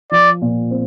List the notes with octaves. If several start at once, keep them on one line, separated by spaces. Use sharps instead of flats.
F3 D5
A#2
C4